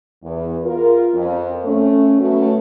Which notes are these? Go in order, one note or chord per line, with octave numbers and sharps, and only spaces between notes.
E2
F4 A#4
F2
A3 C#4
B2 F#3 A3 C#4